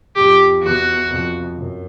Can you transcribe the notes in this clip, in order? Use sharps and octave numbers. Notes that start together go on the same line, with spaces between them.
F2 G4
E2 F#4
F2
F#2